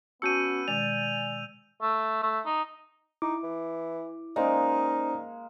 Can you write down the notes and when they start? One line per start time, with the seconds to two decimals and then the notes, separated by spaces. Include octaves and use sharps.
0.22 B3 C#4 F#4 A5 E6 G6 C#7 D#7
0.68 B2 D#3 G#3 D5 G#5 F7
1.82 A3
2.23 A3
2.46 D#4
3.22 D#4 E4 D6
3.43 E3
4.36 G#3 A#3 C#4 D#4 C5 D5